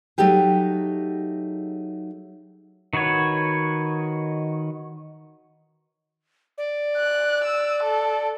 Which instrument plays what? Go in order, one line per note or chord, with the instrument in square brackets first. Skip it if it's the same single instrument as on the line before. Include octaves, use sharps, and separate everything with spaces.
[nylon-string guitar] F#3 A3 D#4 G4 G#4
[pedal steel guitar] D#3 F#4 B4 C#5
[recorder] D5
[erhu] F#6
E6
A4